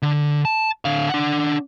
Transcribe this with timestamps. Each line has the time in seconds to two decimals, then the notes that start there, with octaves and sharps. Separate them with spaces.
0.02 D3
0.45 A5
0.85 D3 F5
1.09 D4 F#5